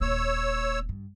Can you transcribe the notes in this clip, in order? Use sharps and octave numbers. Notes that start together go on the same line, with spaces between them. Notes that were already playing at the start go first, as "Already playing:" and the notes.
D#1 A#3 C#5 E6
G2